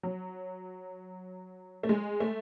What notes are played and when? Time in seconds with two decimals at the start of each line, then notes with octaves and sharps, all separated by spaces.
0.03 F#3
1.83 A3
1.89 G#3
2.20 A3